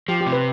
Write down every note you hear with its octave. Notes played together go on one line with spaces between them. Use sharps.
F3 G4
G4
C3
B4